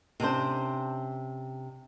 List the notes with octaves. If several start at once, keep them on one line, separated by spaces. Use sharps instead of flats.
C3 C#4 D4 C5